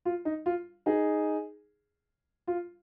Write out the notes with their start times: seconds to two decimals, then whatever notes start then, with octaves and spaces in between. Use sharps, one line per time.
0.05 F4
0.25 D#4
0.46 F4
0.86 D#4 G#4
2.47 F4